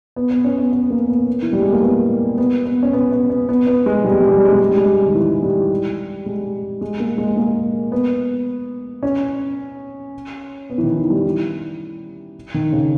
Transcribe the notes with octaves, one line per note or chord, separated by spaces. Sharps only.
B3
B3
C#4
B3
B3
A#3
B3
E3
G3
G#3
A#3
B3
B3
B3
C#4
B3
B3
B3
B3
B3
G#3
G3
G#3
G3
G#3
G3
G#3
G3
G#3
G3
G#3
G3
D#3
E3
G3
G#3
G#3
A#3
G#3
A#3
B3
C#4
B3
E3
D#3
E3
G3
E3
D#3
C#3